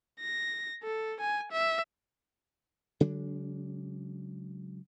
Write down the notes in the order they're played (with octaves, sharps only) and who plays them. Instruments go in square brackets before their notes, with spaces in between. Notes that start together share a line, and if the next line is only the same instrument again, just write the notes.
[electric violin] A#6
A4
G#5
E5
[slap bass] C#3 F#3 G#3 D4